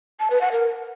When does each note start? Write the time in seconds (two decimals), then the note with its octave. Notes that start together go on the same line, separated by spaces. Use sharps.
0.20 A5
0.30 B4
0.41 F#5
0.52 A#4